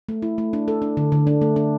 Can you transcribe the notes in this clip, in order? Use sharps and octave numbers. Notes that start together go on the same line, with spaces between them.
A3
E4
A3
D4
A4
D4
D3
D3
D4
A3
D4